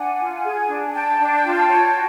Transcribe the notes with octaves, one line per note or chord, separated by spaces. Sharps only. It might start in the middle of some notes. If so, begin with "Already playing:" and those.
Already playing: D4 F#5 G#5
F4
G#4
D4
G#5
D4 G5 A5
D4
F4
C#5
F#4